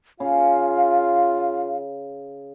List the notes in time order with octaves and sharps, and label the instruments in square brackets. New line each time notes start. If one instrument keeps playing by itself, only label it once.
[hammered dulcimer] C#3 [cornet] F4 [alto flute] F5